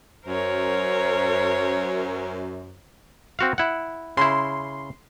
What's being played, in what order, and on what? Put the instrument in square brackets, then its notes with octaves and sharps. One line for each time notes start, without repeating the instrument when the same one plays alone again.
[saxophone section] F#2 [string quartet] A#4 C5 C#5
[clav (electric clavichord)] C4 F#4 F5
E4 F#5
[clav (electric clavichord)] C#3 E4 [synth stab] C6